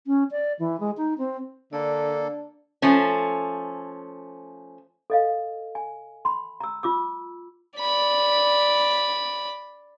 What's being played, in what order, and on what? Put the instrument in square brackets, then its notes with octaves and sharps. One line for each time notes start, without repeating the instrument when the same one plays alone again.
[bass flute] C#4
D5
E3
G#3
D#4
C4
[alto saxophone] D3 [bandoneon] A#3 A4 [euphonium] D4 [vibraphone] D5
[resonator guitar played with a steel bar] F3 A3 C#4
[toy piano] A4 D#5 F5
G#5
B5 C6
A#5 E6
F4 D6 E6
[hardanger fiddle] D5 B5